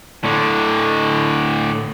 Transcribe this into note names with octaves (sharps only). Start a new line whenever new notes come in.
A2 D3